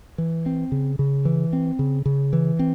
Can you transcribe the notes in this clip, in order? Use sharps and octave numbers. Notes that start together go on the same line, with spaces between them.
E3
C4
C#3
C#3
E3
C4
C#3
C#3
E3
C4